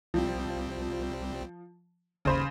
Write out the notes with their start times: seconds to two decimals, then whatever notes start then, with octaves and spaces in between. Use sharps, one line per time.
0.14 C2 F3 G3 C4
2.25 G1 D#2 C#3 C5 B5